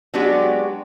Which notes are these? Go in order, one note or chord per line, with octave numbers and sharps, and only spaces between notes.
F#3 G#3 B3 D4 F#4 G4